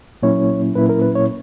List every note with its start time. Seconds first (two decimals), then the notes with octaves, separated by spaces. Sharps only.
0.22 A#2 F#3 A#3 C#4 E4 C#5
0.75 A#2 F#3 A#3 C#4 E4 B4
0.89 A#4
1.02 B4
1.15 C#5